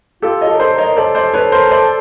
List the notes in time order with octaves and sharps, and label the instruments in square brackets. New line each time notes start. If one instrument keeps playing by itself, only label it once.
[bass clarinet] F4 [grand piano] G4 A4
[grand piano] C#5 D#5
[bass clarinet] A4
A#4
[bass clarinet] A4 [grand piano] C5 D5
[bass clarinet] A#4
[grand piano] C#5 D#5
[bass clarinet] A4 [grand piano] C5 D5
[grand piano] C5 D5
B4 C#5
A#4 C5
C5 D5